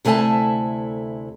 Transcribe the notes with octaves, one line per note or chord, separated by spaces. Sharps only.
D2 C3 A3 E4 G#5 A5